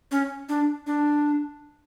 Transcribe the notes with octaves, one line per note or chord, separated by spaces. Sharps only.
C#4
D4
D4